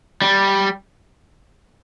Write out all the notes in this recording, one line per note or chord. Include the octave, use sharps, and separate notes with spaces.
G3